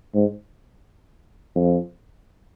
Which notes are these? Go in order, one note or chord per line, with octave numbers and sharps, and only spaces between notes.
G#2
F2